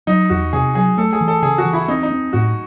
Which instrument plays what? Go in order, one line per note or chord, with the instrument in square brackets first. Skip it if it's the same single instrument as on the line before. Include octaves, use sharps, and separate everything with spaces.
[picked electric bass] F#3 [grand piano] D#4
[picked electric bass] E2 [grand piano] F#4
[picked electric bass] C3 [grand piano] G#4
[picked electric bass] F#3 [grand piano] G#4
[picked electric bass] A3 [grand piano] A4
[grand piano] G#4
[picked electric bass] E3
[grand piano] A4
[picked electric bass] C#3 [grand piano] G#4
[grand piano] F#4
[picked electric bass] E3
[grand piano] E4
[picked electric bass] C4 [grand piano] D#4
[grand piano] D#4
[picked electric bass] C4
[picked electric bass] A2 [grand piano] F#4